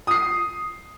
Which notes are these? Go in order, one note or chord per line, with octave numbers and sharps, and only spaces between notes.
D#6 C7